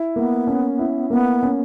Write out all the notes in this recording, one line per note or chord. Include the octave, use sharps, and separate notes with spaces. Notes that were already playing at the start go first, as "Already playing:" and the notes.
Already playing: E4
A#3 B3
C#4
E4
A#3 B3
C#4